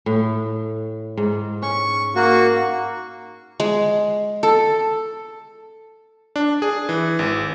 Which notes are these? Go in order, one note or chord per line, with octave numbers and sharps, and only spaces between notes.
A2
G#2
C#4 C#6
A#3 F#4 C#6
G#3
A4
D4
G#4
E3
G#1